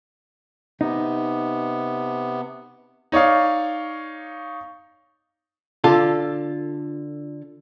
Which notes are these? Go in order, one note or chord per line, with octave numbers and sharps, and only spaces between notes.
C3 B3 D#4
D#4 C#5 D5 F5
D3 F4 A4